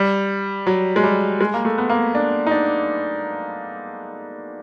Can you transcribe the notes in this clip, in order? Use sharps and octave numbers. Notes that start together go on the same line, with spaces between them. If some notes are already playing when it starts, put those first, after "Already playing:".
Already playing: G3
F#3
G#3
G3
G#3
A#3
A3
B3
A#3
D4
D#4
D4